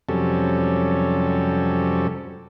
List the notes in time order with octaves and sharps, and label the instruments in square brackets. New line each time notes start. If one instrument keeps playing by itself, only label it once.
[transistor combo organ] F2 C3 F#3 G3 C#4 A4